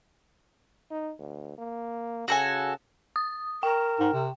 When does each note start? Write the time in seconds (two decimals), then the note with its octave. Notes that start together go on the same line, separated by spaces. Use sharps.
0.91 D#4
1.19 D2
1.58 A#3
2.28 C#3 F#4 A4 G#5
3.16 D#6
3.63 A#4 G5
4.00 G#2
4.13 C3